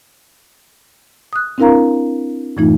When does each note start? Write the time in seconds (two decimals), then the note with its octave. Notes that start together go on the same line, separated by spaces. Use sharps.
1.33 D#6 F#6
1.58 C4 D4 E4 A#4 F5 A#5
2.57 F#2 A2 E3 A3 D#4 F4